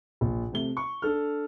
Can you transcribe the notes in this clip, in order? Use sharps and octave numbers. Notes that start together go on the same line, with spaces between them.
A#1
C3 A3 G7
C#6
D4 A4 F6